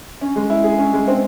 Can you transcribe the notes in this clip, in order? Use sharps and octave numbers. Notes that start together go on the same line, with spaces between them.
C#4
G#3
E4
G#4
C#4
G#3
C4